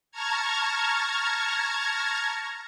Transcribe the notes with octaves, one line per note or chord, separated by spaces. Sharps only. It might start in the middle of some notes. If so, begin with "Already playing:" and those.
A5 A#5 C#6 F6 G#6